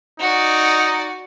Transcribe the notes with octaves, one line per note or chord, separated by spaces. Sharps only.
D#4 F#4 D5